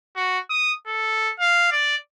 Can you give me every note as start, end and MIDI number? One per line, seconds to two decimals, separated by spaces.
0.16 0.39 66
0.50 0.72 87
0.87 1.32 69
1.40 1.70 77
1.72 1.96 74